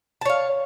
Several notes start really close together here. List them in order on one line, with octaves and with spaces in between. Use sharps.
A5 C#5 F5